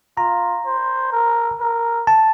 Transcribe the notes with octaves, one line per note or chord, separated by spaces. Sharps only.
F4 A#5
C5
A#4
A#4
A5